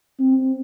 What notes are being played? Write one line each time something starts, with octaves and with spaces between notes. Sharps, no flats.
C4